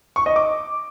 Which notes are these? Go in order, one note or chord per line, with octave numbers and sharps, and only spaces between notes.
C#6
D#5
D6